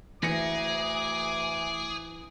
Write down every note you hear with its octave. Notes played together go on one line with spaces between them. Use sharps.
D2 E3 G#4 D6 A#6 C#7